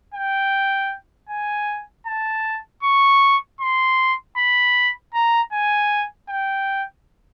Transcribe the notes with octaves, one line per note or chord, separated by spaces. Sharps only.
G5
G#5
A5
C#6
C6
B5
A#5
G#5
G5